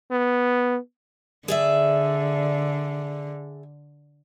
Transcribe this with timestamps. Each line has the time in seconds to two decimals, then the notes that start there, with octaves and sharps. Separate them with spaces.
0.11 B3
1.48 D3 G#4 D5 E5